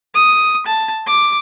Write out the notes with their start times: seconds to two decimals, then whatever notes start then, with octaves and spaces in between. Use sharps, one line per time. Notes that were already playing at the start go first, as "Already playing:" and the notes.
0.14 D#6
0.66 A5
1.07 D6